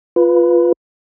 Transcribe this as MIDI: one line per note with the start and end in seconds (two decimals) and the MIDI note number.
0.16 0.72 65
0.16 0.72 71